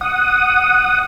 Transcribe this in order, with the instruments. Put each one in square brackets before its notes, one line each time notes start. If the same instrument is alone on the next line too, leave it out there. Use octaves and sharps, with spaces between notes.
[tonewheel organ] F#5 D#6